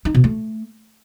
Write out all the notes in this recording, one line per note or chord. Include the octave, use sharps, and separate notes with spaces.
D#4
B2
A3